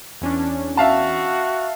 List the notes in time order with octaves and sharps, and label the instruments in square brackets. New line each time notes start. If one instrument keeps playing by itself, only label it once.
[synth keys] E2 C#4 D4
[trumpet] F#4 [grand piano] E5 F5 A5